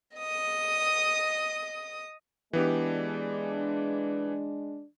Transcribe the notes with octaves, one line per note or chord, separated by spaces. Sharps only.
D#5 D#6
E3 G#3 B3 D4 G4